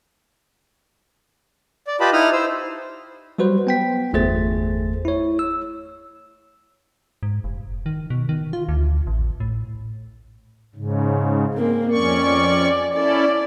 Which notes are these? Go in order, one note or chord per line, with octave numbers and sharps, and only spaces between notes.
D5
F4 G4 B4 D#5 A5 B5
D#4 E4 D#6 F6
C5 E6
F#3 G3 F#4 B4 C5
B3 G5 B6
G1 E2 A3 G#4 C5 A6
E4 C#5
E6
G#2
F1
D#3
B2
D#3
F4
D2
A1
A2
G#2 C#3
A#3 C4
F2 C#4 D5 C#6
C#4 E4 A4 D5